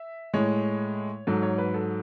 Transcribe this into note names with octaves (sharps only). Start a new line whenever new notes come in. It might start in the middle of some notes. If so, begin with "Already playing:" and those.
Already playing: E5
A2 G#3 C#5
G#2 F#3 A4
C#5
B4
A4